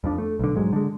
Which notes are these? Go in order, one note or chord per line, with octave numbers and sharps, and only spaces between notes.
F2 F3 D4
A3
B1 D3
G#2 F#3 G#3
D3 G#3